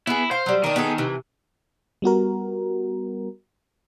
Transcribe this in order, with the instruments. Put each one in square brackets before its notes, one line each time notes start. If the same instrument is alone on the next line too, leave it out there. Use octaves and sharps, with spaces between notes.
[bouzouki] B3 G#4 [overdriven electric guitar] E4
[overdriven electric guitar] C5 [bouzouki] F5
[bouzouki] F#3 G3
[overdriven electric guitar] D#3 [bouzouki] D4 A#4
[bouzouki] B3 G#4 A4
C3 E3
[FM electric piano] G3 B3 F#4 A#4